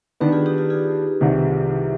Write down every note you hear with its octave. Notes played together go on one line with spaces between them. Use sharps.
D#3 B3 D4 G4 B4
F4 G#4
D#4 G4
F4
F4 G#4
C2 C3 D#3